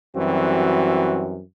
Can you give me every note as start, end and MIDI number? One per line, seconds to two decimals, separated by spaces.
0.17 1.42 42
0.17 1.42 52
0.17 1.42 55
0.17 1.42 60
0.17 1.42 66